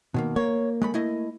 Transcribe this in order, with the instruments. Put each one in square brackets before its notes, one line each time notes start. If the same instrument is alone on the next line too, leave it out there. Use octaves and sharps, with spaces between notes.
[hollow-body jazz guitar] B2 D#3 A#3
[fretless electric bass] A#3 [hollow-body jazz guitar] C#5
[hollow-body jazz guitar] G#3 A3 B5
A3 E4 D#5